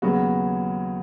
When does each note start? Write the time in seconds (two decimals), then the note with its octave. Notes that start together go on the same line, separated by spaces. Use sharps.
0.02 D#2 C#3 F#3 B3 F#4